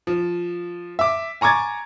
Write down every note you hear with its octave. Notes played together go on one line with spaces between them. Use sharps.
F3
E5 D6
G#5 A#5 C#6 D6 G#6 A6